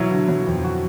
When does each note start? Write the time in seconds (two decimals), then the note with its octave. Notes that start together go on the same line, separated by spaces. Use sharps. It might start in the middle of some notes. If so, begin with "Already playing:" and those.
Already playing: B2 F#3 E4
0.11 D3
0.28 F#3
0.47 F2
0.64 F#4